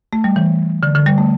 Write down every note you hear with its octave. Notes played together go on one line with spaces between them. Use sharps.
A3
G3
E3
D3
D3
G3
A3